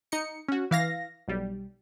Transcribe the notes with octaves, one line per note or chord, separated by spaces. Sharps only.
D#4 C#7
C#4 F#4
E3 F5 A#6
B1 G3